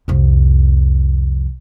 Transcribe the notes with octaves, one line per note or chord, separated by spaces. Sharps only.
C2 F2